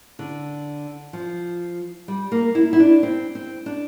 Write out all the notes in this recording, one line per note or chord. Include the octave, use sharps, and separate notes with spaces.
D3
F3
G3
A#3
E4
E4
D4
C4
C4
D4